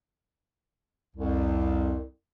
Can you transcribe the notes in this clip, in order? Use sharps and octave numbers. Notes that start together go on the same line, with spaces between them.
C2 F2